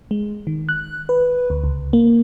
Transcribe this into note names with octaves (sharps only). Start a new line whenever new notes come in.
G#3
D#3
F#6
B4
D2
C#2
A#3